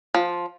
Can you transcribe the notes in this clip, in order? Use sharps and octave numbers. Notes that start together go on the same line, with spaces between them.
F3